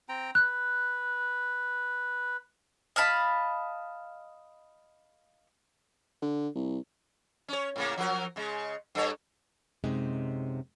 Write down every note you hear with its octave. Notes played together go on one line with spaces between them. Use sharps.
C4 G5 A#5
B4 F#6
D#5 F5 A5 B5
D3
C2
C#4 C#5
A2 C#3 A#3
F3 F#3 A#4
C#3 G#3
G2 A4 C#5
F#2 C3 G#3 D#4